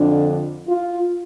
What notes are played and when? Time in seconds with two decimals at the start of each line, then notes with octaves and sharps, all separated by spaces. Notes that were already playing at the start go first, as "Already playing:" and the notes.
Already playing: F2 D3 D4
0.68 F4